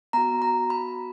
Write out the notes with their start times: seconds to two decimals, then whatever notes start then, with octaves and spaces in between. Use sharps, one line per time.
0.13 B3 F#4 A#5
0.42 A#5
0.70 B5